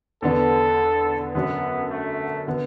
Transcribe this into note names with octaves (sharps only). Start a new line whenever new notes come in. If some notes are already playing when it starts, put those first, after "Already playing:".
E2 D3 B3 D4 A4
F#2 D3 F#3 B3 D4 F#4
A3
D3 B3